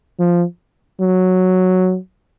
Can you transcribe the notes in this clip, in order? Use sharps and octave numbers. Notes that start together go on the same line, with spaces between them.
F3
F#3